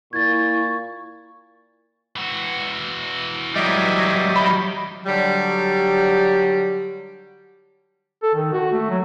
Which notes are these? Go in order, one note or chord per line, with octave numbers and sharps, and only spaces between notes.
A#2 E4 C#6 G#6 A6
E3 F#4
F#3 G3 D#5 E5 D6
D#3 B5
D3 F#3 G3
A4
D#3
F#4
A3
F#3